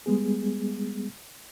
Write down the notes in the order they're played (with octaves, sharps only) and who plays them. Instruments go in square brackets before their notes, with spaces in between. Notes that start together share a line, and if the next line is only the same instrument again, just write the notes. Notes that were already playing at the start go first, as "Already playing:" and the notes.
[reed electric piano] G3 G#3 B3 G#4